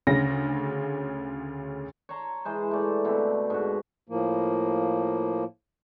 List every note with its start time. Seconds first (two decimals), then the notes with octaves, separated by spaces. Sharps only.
0.07 D2 C#3 A#6
2.09 C#5 A5 A#5 C6
2.45 E3 G#3 C5
2.71 A3 D5
3.05 B2 D3 A3 C4
3.50 G#2 F#4
4.09 A2 F3 A#3